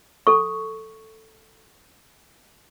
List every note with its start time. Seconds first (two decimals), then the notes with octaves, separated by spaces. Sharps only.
0.27 A4 C#6